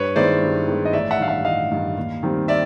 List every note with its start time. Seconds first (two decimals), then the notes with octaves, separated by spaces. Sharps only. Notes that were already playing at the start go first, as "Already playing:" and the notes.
Already playing: G2 B4 C#5
0.16 D#3 G#3 B3 E4 C5 D5
0.42 G2
0.68 D#3 G#3 B3 E4
0.85 D#5
0.93 A1 D5 E5
1.11 E5 F#5
1.19 G2 D#3 F5
1.28 E5 F#5
1.45 A1 D#5 F5
1.71 G2 D#3
1.97 D#2
2.23 D#3 G3 C4
2.48 D5 E5